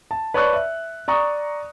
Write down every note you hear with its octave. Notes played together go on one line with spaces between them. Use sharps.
A5
B4 C#5 D5 A5 C#6 F#6
E5
D5 A#5 C#6 D#6